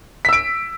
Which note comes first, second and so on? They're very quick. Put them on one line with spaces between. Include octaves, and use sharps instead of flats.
B6 E6 D7